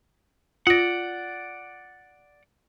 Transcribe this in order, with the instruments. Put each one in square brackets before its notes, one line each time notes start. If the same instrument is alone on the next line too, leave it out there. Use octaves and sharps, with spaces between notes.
[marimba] F4 A#6 [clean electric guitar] D5 F#5